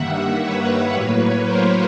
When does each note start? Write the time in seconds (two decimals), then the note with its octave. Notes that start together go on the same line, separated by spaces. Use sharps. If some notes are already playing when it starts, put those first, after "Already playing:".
Already playing: G2 D#3 G3 A#3 E5 F#5
0.41 B4 C#5
0.92 A2 F#3 A#3 B4 C#5
1.44 A#4 C5